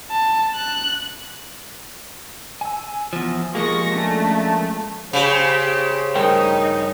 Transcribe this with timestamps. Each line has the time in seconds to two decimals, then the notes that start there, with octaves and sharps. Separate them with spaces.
0.11 A5
0.55 F#6
2.61 G#5 E6
3.13 E2 F3
3.55 F3 G#3 A#3 F4 G4 G#4 C#6 A#6
3.96 A3 C#4 D4 A#4
5.13 C#3 G4 C5
6.15 G2 D#4 A#4 G5